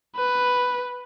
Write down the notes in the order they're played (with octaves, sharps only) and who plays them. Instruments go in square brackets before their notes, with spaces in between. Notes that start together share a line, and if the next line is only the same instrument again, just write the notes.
[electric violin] B4